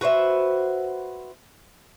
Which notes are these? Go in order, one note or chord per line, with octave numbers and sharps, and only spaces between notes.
F#4 B4 C5 E5